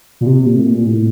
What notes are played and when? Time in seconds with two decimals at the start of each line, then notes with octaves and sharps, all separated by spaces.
0.21 A#2
0.26 C3
0.46 A#2
0.57 A2
0.66 A#2
0.86 A2